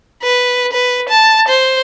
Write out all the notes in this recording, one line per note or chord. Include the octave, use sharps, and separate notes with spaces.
B4
B4
A5
C5